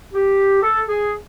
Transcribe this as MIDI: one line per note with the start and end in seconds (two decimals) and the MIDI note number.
0.13 0.60 67
0.63 0.82 69
0.89 1.12 68